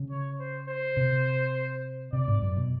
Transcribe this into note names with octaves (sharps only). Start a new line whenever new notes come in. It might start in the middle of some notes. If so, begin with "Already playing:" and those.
Already playing: C#3
C#5
C5
C5
C3
C3 D5
G#2
F#2
B2